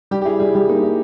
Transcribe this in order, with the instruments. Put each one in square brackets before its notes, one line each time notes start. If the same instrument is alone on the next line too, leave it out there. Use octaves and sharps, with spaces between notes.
[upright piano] G3 [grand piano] G4
[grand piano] G4
[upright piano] E4 [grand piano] G#4
[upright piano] G3 [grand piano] G#4
[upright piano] G3 [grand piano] G4
[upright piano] A#3 [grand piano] D#4
[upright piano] E4